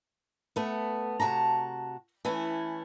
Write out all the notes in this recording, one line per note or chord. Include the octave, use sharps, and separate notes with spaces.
A3 B3
C3 F#4 A5 A#5
E3 A3 C#4 E4